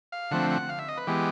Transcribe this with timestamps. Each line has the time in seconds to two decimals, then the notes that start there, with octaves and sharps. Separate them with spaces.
0.12 F5
0.31 D3 F3 A3 C4 F#5
0.50 F#5
0.69 F5
0.79 E5
0.88 D#5
0.97 B4
1.07 E3 G#3 B3 G4